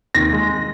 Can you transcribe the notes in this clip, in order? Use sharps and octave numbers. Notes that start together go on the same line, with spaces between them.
D#2 A#6
G#3